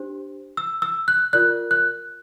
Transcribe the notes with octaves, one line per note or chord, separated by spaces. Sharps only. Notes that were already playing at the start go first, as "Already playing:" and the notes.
Already playing: D4 G4 C5
E6
E6
F#6
F4 A#4 D5 F#6
F#6